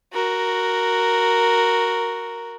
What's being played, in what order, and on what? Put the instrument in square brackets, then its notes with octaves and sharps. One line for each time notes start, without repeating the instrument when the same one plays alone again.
[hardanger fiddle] F#4 A#4